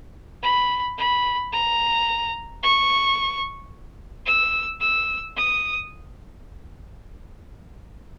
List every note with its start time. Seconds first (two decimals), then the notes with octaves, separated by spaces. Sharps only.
0.43 B5
0.98 B5
1.52 A#5
2.63 C#6
4.26 E6
4.81 E6
5.37 D#6